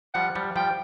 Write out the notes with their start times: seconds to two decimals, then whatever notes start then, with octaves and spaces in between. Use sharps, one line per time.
0.14 F3 G3 F#5
0.35 F3 G3
0.56 F3 G3 G5